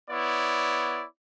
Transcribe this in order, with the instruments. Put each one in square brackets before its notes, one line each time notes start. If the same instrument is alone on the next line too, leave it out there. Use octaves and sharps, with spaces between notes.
[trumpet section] B3 E4 C#5 D5